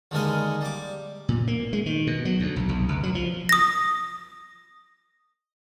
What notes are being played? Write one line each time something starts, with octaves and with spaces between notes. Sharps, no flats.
D#2 D3 G#3 A#4 D#5
G3 D6
A#2
A#3
G#3
D#3
B2
F#3
D2
B1
B1
C#2
F#3
F3
D#6 A#6